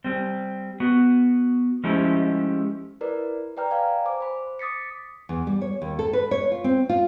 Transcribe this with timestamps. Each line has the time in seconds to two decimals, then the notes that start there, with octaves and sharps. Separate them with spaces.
0.04 G3 C4
0.80 B3 F#4
1.84 F3 G#3 A3 C#4 E4 G4
3.01 E4 A#4 B4 D5
3.57 B4 D5 G5 A#5 F6
3.71 D5 F5 G#5 A#5
4.06 C5 D6
4.21 C5 B5
4.59 D6 D#6 A6 B6 C#7
5.29 E2
5.47 G3
5.62 C#5
5.82 D#2
5.99 A4
6.13 B4
6.31 C#5
6.52 F4
6.64 C4
6.89 F4